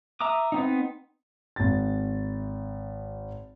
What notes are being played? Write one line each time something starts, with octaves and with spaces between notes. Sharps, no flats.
E5 A#5 D6 D#6
B3 C4 D#4
G#1 A6